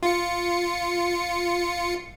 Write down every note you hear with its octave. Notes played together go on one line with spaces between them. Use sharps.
F4 C#7